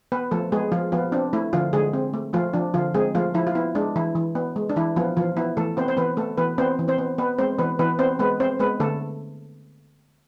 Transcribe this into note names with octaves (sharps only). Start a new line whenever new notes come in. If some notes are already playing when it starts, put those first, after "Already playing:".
B3 B4
F3 A3 A4
G#3 B3 G#4
F3 F4
F3 B3 F4
C4 D4
A3 E4
D3 F3 F4
D3 G#3 G#4
C4
A3
F3 A3 F4
F3 D4
D3 F3 F4
G#3 C4 G#4
F3 A3 F4
F3 E4
F4
B3 E4
G#3 D4
E3 E4
E3
B3
G#3
D4
E3 E4
F3 B3 F4
E3 F3 F4
B3 E4
E3 A3 A4
B3 C4 C5
C5
E3 B3 B4
A3 B3 A4
E3 B3 B4
B3 C4 C5
E3
C4 C5
B3
B3 B4
G#3 C4 C5
E3 B3 B4
E3 B3 B4
B3 C4 C5
G#3 B3 B4
C4 C5
G#3 B3 B4
D3 A3 A4